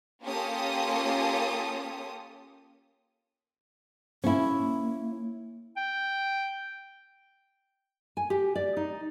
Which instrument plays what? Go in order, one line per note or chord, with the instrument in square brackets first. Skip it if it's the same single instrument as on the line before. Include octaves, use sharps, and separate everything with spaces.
[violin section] A#3 C#4 F4 G4 A4 D#6
[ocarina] A#3 [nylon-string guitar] C#4 E4
[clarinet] G5
[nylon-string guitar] G#5
G4
D5
D#4